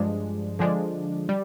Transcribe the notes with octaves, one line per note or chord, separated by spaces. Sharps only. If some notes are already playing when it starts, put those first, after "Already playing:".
Already playing: G2 F3 G#3 D4
D3 F3 G#3 D4
G3